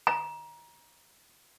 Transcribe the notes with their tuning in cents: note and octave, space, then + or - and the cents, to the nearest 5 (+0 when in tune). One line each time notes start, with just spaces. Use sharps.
A#5 +25